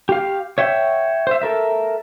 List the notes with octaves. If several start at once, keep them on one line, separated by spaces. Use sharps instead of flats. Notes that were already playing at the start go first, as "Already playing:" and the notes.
G4 F5
C#5 E5 F#5 G5
C5 E5
A4 A#4 E5